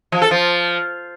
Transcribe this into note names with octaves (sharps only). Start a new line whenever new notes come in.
F3
A4
F3